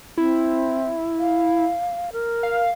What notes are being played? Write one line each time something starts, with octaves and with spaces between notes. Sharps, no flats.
C4 E4
F5
A#4
F5